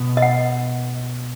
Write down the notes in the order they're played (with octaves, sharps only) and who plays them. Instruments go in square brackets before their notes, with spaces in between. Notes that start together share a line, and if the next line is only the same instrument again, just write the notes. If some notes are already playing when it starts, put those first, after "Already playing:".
Already playing: [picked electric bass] B2 B3
[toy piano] D#5
F#5